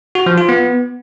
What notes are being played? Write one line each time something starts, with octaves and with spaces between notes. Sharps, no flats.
F#4
F3
F4
B3